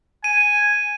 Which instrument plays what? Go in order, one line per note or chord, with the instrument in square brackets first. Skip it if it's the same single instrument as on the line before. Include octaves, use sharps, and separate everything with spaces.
[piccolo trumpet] G#5 [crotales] D#7